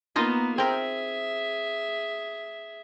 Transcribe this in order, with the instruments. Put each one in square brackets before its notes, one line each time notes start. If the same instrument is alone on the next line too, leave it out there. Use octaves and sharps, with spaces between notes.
[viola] A#3 B3 [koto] D#4 F4 D#5
[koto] C4 A#4 [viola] G#4 E5